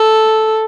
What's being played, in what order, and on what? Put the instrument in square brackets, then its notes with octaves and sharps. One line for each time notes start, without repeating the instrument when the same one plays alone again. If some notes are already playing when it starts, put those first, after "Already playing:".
Already playing: [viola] A4